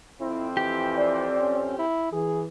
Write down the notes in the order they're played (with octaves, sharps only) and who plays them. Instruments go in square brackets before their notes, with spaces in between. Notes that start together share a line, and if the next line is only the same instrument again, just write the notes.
[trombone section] F2 C4 [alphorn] E4
[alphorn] E3 [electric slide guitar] G4
[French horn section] D5
[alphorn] C#4
E4
[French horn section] E3 [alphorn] G#4